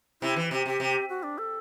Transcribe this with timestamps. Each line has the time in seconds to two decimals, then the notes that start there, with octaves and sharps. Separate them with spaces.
0.22 C3 E4
0.36 E3
0.51 C3 G4
0.66 C3 G4
0.80 C3
1.09 F#4
1.23 D4
1.38 A4